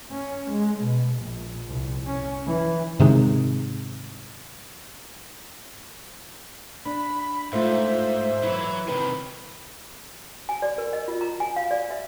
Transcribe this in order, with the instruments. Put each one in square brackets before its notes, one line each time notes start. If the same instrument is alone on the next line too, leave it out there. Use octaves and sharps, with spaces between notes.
[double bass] C#4
G#3
B2
A#1
C2
C#4
E3
[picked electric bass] G#2 C3 D#3 G#3
[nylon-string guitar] D4 [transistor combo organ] B5
[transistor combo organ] B5
[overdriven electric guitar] G#2 [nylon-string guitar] A3 F4 [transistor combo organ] C5 E5
[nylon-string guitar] E3 E4 [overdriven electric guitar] F#3
[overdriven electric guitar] C3 D#3 [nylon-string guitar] B4
[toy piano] G#5
D5
A#4
D#5
F4
A#5
G#5
F5
D5
E5